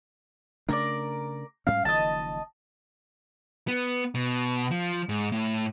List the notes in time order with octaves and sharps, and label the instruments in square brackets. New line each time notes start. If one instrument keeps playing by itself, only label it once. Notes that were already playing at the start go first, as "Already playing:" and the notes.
[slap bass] C#3 A3 D4 [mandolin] A#4 C#5 D5
[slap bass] G#2 G3 C#4 [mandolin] F5
[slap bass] F#1 D#3 F3 [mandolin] D#5 A5
[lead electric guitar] B3
B2
F3
G#2
A2